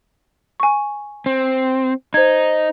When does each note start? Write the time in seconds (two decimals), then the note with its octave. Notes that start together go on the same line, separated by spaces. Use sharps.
0.60 G#5 C#6
1.26 C4
2.14 D#4 C5 G#6